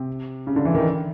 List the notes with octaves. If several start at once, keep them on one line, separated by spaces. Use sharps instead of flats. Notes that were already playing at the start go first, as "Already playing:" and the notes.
Already playing: C3
C#3
D3
E3
D#3